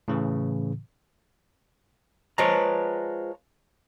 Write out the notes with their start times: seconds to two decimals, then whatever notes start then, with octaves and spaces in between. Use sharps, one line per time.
0.08 A2 C#3 E3
2.38 F3 G#3 B4 C#5 A5 A#5